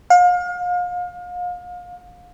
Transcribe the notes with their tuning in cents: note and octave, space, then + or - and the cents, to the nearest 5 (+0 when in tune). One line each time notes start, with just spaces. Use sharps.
F5 +35